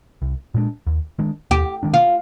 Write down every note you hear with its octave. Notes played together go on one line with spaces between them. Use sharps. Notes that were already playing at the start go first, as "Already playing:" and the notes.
C2
A#2 G#3 D4
D#2
D#3 G#3 D4
D#2 G4
D#3 G#3 D4
F4